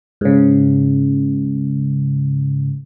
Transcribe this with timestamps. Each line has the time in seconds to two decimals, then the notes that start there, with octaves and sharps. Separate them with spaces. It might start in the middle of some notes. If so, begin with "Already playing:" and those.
0.21 G#2 C#3